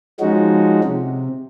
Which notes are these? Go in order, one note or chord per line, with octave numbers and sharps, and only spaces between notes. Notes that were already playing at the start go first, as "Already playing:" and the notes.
F3 G#3 C#4 D#4 F#4
C3